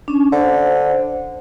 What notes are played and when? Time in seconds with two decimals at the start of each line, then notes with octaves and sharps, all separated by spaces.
0.08 C#4 D4
0.32 D3 C5